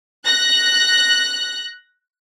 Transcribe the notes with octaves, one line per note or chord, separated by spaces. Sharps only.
F#6 A#6